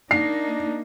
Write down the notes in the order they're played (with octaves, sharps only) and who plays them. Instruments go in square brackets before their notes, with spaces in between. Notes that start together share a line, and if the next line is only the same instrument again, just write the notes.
[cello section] A#3 D#4 [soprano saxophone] D4 [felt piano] C7